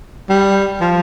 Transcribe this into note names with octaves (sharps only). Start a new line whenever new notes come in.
G3
F3